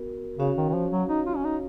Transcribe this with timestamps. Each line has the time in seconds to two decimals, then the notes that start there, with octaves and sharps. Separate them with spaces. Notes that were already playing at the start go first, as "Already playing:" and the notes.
Already playing: B3 F#4 A#4
0.38 C#3 C#4 F#4 C#5 F5
0.57 D#3
0.69 D#3
0.74 F3
0.91 F#3
1.09 D#4
1.26 F4
1.36 C#4
1.45 D#4